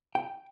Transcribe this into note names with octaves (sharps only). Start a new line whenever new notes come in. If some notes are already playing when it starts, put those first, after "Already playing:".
G5